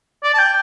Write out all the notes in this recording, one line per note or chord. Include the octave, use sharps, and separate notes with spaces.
D5
A5
G5